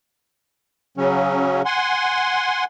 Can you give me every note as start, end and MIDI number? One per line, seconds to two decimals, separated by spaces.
0.97 1.62 49
0.97 1.62 54
0.97 1.62 61
1.65 2.64 78
1.65 2.64 80
1.65 2.64 84